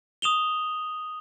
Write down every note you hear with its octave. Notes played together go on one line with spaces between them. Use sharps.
D#6 E7 F7 G7